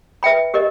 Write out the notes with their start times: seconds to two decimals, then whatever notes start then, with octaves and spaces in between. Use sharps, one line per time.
0.23 B4 E5 G5 B5
0.54 G4 A#4 D#5